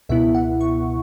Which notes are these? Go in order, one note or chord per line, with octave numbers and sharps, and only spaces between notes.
C#2 B2 B3 E4 E5
F#5
C#6